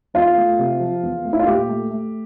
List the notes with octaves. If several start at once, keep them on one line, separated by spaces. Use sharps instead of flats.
E2 F4
A3
C3
F3
E2
A3
E4
F4
A#2 G4
A3
A3